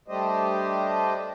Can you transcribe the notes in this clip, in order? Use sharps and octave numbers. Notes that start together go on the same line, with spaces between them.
G3 A3 D4 G4 C5 D#5